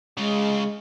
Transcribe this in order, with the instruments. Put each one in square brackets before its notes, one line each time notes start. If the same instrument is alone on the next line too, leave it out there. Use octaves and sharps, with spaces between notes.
[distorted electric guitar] C#3 F4 [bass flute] G#3